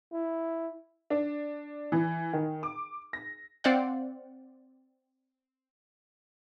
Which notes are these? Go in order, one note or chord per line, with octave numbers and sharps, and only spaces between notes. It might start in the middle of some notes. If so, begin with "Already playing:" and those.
E4
D4
E3
D#3
D6
A#6
C4 C5 D5 F5 F#5